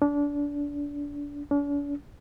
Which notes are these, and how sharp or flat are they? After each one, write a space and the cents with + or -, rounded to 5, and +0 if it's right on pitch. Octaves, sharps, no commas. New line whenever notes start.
D4 -25
D4 -45